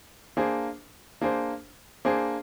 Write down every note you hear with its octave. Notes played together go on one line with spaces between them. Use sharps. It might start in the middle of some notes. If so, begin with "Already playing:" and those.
A#3 D4 G#4 C5
A#3 D4 G#4 C5
A#3 D4 G#4 C5